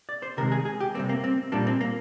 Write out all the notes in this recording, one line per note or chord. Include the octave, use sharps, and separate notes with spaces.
D5
C5
C3 D#3 G#3 A#4
G#4
G#4
G4
C3 G3 A#3 C4
A#3
C4
A#2 G3 A#3 D4
C4
A#3